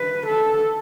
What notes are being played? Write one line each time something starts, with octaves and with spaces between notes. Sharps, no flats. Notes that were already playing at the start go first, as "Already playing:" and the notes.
Already playing: B4
A4